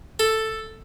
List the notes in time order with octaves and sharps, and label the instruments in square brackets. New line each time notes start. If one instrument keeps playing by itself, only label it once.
[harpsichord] A4